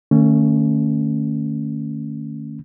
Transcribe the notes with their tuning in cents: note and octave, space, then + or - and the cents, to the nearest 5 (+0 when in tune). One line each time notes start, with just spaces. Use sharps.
D#3 -30 A3 +30 C#4 +0